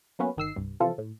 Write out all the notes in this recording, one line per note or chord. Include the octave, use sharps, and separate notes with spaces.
F#3 A#3 B3 C#4 B4
G1 D#3 E6 C7
C2 G2
C3 E3 F3 F4 A4
A2